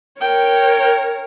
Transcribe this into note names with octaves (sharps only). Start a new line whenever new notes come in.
A#4 C#5 G5